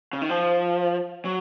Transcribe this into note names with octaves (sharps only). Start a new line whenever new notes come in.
C#3
D#3
F3
F#3